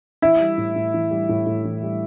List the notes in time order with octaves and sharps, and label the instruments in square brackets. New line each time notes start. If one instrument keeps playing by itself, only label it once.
[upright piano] E3 [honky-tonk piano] E4
[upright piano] G3
A2
A2
E3
G3
A2
A2
E3
G3